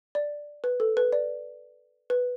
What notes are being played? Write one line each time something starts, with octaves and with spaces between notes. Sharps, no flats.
D5
B4
A4
B4
D5
B4